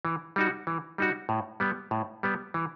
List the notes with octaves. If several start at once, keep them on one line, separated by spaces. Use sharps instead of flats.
E3
G3 D#4 F#4
E3
G3 D#4 F#4
A2
G3 B3
A2
G3 B3
E3